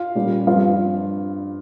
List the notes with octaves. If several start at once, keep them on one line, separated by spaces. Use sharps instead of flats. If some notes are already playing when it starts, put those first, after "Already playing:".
Already playing: F4 F5
A#2 G3 C#4
G2 F3 C4 F4 F5